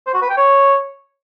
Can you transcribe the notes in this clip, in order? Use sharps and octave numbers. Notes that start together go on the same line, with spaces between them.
C5
F#4
B4
G5
C#5